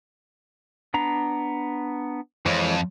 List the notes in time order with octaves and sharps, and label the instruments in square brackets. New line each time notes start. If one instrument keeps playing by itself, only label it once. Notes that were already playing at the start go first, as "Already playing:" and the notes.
[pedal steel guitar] B3 D4 A#5
[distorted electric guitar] F2 [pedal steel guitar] E3 G#3 C#5